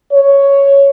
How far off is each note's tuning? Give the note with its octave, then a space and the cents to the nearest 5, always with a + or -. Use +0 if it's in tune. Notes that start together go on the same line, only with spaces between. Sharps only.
C#5 +5